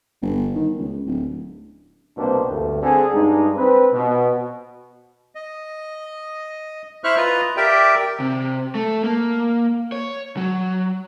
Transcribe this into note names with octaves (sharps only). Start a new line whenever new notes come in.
G1
D#3
C#2
D1
C2 B2 A#3 C4 D4 C5
D2 G2
D3 C4 G#4
G2 G#3 D4 D#4
C4 B4
B2
D#5
E4 C5 E5 C#6 F6 F#6
F4 B4 D#5 A#5
G4 A#4 D5 E5 G5
C3
A3
A#3
C#5
F#3